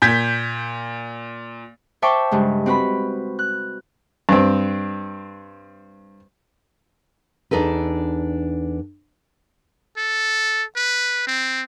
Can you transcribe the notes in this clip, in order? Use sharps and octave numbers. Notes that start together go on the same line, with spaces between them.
A#2 G6 G#6 B6
C5 E5 G5 A5 C#6 D6
G2 C#3 G#3
C4 F#4 B4 B5
F#6
G2 C4
E2 D4 D#4 A4 B4
A4
B4
C4